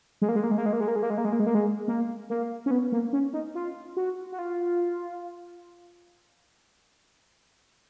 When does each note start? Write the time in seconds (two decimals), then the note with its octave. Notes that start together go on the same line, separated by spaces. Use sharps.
0.22 G#3
0.29 A#3
0.36 G#3
0.44 A#3
0.51 G#3
0.58 A#3
0.66 G#3
0.73 A#3
0.81 G#3
0.88 A#3
0.96 G#3
1.03 A#3
1.10 G#3
1.18 A#3
1.25 G#3
1.33 A#3
1.40 G#3
1.47 A#3
1.55 G#3
1.88 A#3
2.30 A#3
2.66 C#4
2.71 B3
2.92 A#3
3.13 C#4
3.33 D#4
3.55 F4
3.97 F#4
4.32 F#4
4.39 F4